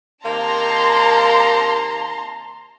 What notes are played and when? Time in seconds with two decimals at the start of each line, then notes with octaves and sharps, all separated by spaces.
0.24 C3 D#3 A#3 A5 A#5 C6